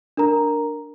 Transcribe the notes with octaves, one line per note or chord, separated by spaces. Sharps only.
D4 A#4 A#5